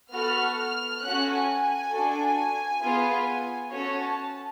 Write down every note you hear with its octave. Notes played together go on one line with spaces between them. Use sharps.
B3 F#4 A4 F6
F6
C#4 F#4 A4 F#6
G#5
G#5
D4 F#4 A4
B3 F4 G#4
C#4 F#4 A4 C#5
A5